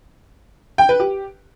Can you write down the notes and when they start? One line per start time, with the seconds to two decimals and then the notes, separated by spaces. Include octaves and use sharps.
0.78 G5
0.89 B4
1.00 G4